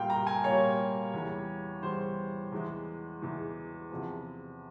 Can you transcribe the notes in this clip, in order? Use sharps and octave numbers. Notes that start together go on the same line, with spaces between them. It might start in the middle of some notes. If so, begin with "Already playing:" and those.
Already playing: A#2 G3 A#3 F5 G5
A#5
G#5
A#2 G3 A#3 C#5
E2 E3 G3
E2 E3 G3 C5
E2 E3 G#3
E2 E3 G#3
E2 C3 F3